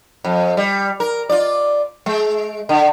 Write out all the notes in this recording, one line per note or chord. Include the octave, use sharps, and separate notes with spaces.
F2
G3
A#4
F4 D5
G#3
D3